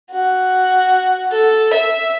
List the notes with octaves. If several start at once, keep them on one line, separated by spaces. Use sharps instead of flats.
F#4
A4
E5